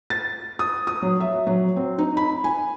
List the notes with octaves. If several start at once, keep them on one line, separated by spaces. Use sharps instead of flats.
A6
D#6
D#6
F#3
E5
F#3
C4
D#4
B5
G#5